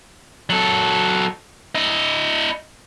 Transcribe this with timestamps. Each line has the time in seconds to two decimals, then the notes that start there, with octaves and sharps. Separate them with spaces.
0.50 F#3 A4
1.75 E4 D#5